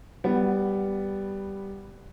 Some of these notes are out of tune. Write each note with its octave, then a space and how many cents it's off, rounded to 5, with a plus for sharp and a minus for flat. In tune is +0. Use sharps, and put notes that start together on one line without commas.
G3 +0 B3 +0 F#5 +15